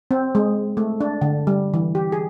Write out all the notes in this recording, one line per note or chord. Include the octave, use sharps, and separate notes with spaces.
C4
G#3
A3
D4
D3
G3
E3
G4
G#4